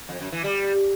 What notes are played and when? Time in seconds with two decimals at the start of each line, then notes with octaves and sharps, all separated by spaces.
0.09 F2
0.21 F#2
0.32 E3
0.44 G3